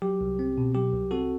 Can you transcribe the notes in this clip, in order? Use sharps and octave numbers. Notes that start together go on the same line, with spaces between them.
F#3 G4
C2
C4
B2
F#3 G4
C2
C4 F#4 A4